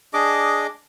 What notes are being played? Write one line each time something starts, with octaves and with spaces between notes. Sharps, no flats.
D4 G#4 D#5 D6